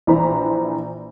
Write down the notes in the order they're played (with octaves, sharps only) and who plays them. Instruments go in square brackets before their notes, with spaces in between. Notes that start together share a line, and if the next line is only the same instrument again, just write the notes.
[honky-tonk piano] A#1 E3 C5 A#5 B5